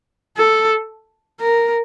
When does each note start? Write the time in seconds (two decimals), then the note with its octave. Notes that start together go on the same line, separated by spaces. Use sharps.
0.37 A4
1.41 A#4